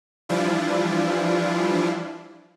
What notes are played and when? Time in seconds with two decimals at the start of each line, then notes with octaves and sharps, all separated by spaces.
0.29 E3 F3 G3 D4 E4 F4